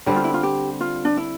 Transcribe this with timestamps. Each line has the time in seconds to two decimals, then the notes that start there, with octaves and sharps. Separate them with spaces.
0.06 D3 G3 C4 G4
0.16 F4
0.24 E4
0.34 F4
0.43 G4
0.81 F4
1.05 D4
1.17 E4